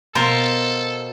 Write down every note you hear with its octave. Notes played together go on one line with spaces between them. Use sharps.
B2 F4 A4 A#4 C5